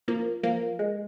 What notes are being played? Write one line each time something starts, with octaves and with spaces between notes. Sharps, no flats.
F3 A#3
F3 A#3
G#3